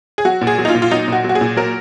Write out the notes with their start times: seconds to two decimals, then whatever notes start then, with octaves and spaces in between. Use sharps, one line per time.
0.18 G#4
0.25 F#3 F#4
0.41 A#2
0.47 G#4
0.58 F#3
0.65 D#4
0.69 F4
0.75 A#2
0.82 F4
0.91 F#3 D#4
1.08 A#2 F#4
1.24 F#3
1.29 F#4
1.35 G#4
1.41 A#2
1.57 F#3 A#4